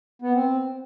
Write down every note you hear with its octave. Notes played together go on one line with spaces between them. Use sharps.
B3
C4